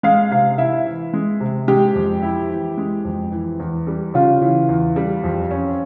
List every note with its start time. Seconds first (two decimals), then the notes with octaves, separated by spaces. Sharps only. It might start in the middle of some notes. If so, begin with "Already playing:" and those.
0.03 G#3 F5
0.31 C3 F5
0.58 E4 E5
0.86 E3
1.13 G#3
1.40 C3
1.68 G#3 G4
1.95 F2
2.23 E4
2.50 E3
2.78 G#3
3.05 F2
3.32 E3
3.60 E2
3.87 G3
4.14 C#3 F4
4.42 E3
4.69 E2
4.96 G3
5.24 F2
5.51 C#4